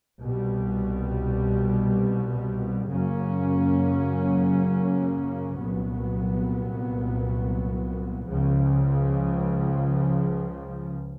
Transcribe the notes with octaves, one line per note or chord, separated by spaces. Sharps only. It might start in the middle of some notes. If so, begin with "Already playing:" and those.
C2 B2 G3
F#2 C#3 F#3 A#3 C#4
C2 A#2 F#3 B3
C#2 C#3 F3